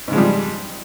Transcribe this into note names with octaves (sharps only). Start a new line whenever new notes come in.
G#2 C#3 F3 G3 G#3